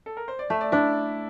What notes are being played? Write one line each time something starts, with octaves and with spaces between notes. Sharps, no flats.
A4
A#4
C5
D5
A3 E5
D5
D4 E4